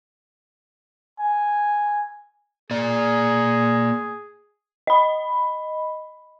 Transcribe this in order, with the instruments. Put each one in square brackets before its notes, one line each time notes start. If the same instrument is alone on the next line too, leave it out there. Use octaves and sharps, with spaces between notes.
[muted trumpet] G#5
[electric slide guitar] A#3 D5 [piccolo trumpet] G#4
[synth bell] D#5 B5